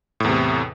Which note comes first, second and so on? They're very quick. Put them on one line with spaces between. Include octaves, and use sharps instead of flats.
A2 E2 C3